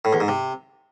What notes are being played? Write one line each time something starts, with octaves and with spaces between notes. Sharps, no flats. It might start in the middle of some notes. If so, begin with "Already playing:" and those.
A2
E2
G#2
C3